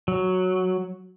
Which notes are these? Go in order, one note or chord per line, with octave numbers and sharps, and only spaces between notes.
F#3